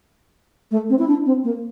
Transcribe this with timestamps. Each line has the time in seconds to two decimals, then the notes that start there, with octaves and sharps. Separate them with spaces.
0.71 A3
0.89 C4
0.98 E4
1.08 D4
1.25 C4
1.44 A#3